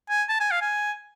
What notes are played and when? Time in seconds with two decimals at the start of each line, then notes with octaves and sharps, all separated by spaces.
0.10 G#5
0.29 A5
0.40 G#5
0.51 F5
0.62 G#5